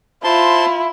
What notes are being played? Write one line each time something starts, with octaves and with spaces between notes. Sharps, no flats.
E4 F4 C5 A5 C6